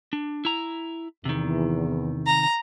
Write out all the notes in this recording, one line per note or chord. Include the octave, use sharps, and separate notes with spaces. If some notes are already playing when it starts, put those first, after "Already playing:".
D4
E4 A#5
E2 C3 D#3
A#5